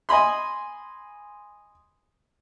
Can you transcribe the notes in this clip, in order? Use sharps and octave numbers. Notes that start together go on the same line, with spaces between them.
D#5 G#5 B5 C6